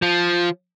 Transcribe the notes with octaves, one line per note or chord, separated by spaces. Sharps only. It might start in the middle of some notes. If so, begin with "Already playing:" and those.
F3